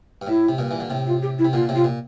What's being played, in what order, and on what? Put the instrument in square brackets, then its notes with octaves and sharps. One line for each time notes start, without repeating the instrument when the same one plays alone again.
[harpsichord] G2
[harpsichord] A2 [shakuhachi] E4
[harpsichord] C3
G2 A#2
E3
D3
A2 C3
[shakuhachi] F4
G4
E4
[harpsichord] C3
[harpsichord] A#2 D3 [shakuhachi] F4
[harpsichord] A2 C3
[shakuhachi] F4
[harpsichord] A#2